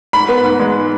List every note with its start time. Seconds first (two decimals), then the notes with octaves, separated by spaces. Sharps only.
0.13 G#2 B5
0.29 B3
0.45 G#2
0.60 G#3